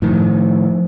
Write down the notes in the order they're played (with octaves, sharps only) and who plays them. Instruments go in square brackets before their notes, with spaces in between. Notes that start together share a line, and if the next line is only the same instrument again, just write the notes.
[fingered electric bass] A2 D#3 [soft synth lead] F3